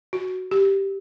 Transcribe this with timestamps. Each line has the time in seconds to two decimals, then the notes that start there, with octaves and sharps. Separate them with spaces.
0.13 F#4
0.51 G4